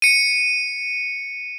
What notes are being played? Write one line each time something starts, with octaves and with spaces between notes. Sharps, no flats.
C#7 D#7